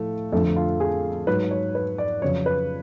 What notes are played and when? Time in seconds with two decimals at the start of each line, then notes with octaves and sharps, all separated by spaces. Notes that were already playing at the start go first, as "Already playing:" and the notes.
Already playing: A2 F3 A3
0.32 F2 D3 F3 A3
0.56 F4
0.80 G#4
1.27 G#2 F#3 B4
1.51 C#5
1.75 B4
1.98 D5
2.22 F2 C#3 F#3 C#5
2.46 B4